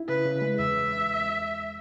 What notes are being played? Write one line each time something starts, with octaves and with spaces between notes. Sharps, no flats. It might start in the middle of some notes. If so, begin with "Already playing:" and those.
Already playing: E4
C#3 B4
C#3
G#3
E2 E5